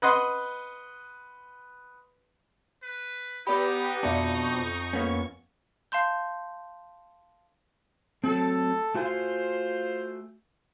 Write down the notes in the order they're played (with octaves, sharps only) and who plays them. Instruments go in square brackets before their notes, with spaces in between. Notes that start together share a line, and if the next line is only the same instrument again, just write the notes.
[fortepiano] B4 D#5 F#5 C6
[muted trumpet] B4
[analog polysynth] B3 G4 [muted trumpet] D#4 [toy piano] B4 D5 B5
[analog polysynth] F2 C#6 [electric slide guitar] B2 D4 [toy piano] D5 E5 F5
[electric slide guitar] A#3 B3 C#4
[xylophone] F5 A5 C6 G6
[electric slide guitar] F#3 A3 C4 [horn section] A4
[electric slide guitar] A3 F#4 G#5 [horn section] F4 C5